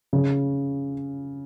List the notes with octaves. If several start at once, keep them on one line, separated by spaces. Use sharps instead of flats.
C#3